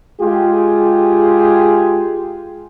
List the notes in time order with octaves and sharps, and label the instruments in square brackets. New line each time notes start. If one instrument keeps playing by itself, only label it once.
[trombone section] G#3 F4 G4 G#4